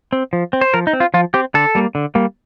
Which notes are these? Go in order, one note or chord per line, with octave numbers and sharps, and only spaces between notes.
C4
F3
C4
C5
F3 A#4
D#4
C4
F4
F3 F4
C4 G4
D3 A4
G3 A#3
D3
G3 A#3